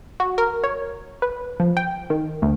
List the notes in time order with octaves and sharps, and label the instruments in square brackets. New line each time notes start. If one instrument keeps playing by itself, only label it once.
[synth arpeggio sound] F#4
A#4
C#5
B4
F3
G5
D#3
D2